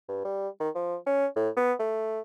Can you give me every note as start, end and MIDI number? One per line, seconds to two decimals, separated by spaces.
0.08 0.25 43
0.25 0.48 55
0.60 0.69 51
0.75 0.96 53
1.06 1.26 61
1.36 1.49 45
1.56 1.73 59
1.79 2.20 57